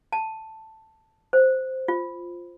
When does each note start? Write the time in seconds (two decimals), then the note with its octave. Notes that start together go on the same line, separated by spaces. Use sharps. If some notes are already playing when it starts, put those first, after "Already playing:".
0.12 A5
1.33 C5
1.88 F4